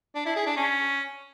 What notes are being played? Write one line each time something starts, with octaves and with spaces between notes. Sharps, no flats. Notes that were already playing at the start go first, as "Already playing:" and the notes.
D4
E4
G#4
D4
C#4